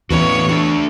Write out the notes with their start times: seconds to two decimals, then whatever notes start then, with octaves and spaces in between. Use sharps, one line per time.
0.10 E2 A2 E3 A3 C#4 E4 F#4 C#5
0.49 A3 D4 F#4 A4